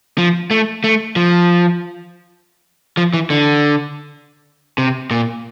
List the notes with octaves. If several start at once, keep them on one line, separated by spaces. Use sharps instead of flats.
F3
A3
A3
F3
F3
E3
D3
C3
A#2